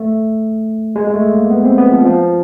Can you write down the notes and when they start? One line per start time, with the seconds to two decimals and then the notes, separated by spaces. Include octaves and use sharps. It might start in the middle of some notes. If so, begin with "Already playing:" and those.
Already playing: A3
0.96 G#3
1.07 G#3
1.14 A3
1.33 A#3
1.50 B3
1.64 C4
1.78 B3
1.92 F3
2.05 F3